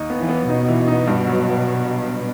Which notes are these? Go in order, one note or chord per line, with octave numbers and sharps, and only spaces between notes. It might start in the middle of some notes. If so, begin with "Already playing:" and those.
Already playing: D#2 D#4
B3
E3
B3
B2 D#4
E3
D#4
G2
F#3